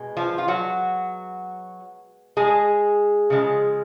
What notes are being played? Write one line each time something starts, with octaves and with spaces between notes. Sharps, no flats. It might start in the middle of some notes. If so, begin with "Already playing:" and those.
Already playing: B2 G#3
F3 F4
F4
F#3 F#4
G#3 G#4
C#3 F3 G#3